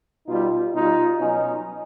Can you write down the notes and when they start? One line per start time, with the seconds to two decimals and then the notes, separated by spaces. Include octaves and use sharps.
0.27 B2 G3 D#4 F4
0.74 B2 G3 D#4 F4
1.20 B2 F#3 C#4 D#4